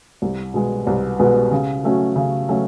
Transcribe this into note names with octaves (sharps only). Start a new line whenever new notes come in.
C2
B2 G#3 B3
C2
B2 G#3 B3
C#3
F#3 A3 C#4 F#4
C#3
F#3 A3 C#4 F#4